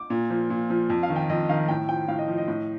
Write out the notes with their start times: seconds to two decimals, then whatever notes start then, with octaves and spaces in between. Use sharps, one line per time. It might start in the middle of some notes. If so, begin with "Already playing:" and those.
Already playing: D6
0.10 A#2
0.30 F3
0.50 A#2
0.70 F3
0.90 F2
1.03 F5
1.10 D#3
1.16 G5
1.29 F2 D#5
1.49 D#3 F5
1.69 A2 G5
1.88 F3 G5
2.08 A2 F5
2.19 D#5
2.28 F3
2.38 D#5
2.48 A2